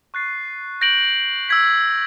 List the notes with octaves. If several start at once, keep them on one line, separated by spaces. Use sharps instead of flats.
C#6 F#6 A6 C7
G6 A#6 D7 F#7
E6 G#6 B6